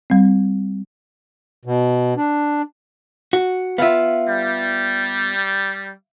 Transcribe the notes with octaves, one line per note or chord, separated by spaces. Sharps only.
G3 C4
B2
D4
F#4
B3 F4 E5 F5
G3